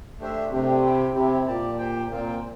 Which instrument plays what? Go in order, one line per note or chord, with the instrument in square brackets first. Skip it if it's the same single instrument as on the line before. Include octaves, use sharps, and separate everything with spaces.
[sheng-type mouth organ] A3 D4 G4 C5 E5
[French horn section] C3 [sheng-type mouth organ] A3 D4 G4
[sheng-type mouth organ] E4 G4 C5 G5
[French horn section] C3 [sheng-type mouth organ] C4 E4 G4
[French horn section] A#2 [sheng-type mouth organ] G4 D5 A5
[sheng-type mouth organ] G4 C5 G5
[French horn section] A#2 [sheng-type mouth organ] C4 F4 C5 G5